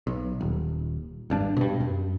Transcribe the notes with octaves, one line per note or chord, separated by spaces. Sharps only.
B1
D#1
G#1 G2 D4
G2 B2
F#2